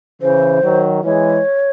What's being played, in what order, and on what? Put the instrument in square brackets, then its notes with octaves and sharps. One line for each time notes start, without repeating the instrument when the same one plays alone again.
[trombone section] C#3 E3 [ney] C5
[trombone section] D#3 F#3
[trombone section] E3 G#3 [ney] C#5